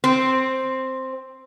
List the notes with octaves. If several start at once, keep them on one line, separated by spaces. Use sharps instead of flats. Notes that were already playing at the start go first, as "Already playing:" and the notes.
C4